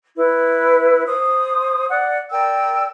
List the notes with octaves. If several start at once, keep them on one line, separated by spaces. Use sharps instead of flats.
E4 B4
C5 D#6
D5 F#5
A#4 D5 G5 E6